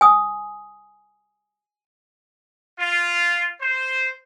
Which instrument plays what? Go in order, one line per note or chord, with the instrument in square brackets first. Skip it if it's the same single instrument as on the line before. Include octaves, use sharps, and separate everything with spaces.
[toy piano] G#5 D#6
[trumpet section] F4
C5